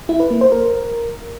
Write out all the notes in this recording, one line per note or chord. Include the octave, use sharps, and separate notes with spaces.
E4
B4
A#3
C5
A#4